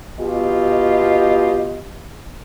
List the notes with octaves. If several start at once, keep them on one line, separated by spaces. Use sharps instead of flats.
B2 F4 G4 D#5